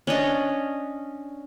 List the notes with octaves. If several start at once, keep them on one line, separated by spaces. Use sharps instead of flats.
C#4 D4 D#5